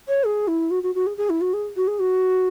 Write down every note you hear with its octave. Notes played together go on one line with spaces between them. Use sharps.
C#5
G#4
E4
F#4
F#4
F#4
G#4
G#4
E4
F#4
G#4
F#4
G#4
F#4